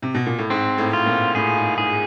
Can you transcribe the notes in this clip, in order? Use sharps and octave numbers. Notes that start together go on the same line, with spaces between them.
C3
B2
A#2
A2
G#2 C4
A2
F4
A#2
A2 G#4
G#2
G#2 G#4